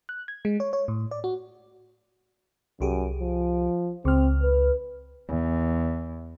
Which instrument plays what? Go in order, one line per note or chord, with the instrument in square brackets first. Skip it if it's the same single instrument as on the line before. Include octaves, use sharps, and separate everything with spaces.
[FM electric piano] F#6
G#6
G#3
C#5
C#5
A2
D5
F#4
[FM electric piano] C2 G4 G#4 [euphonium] F#2
[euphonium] F3
[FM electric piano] C#2 F6 [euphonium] C4
[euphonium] B4
[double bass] E2